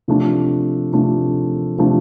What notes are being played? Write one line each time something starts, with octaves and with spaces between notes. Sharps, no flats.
C3 F3 A3 D4
C3 F3 A3 D4
C3 F3 A3 D4